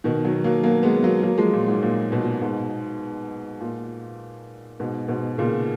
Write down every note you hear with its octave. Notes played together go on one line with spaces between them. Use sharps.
B2 D#3
D#3 F#3
F#3 A#3
F#3 A#3
G#3 B3
F#3 A#3
F#3 A#3
F3 G#3
A#2
G#2
A#2
B2
A#2
G#2 B2
A#2
G#2 B2
G#2 B2
A#2 C#3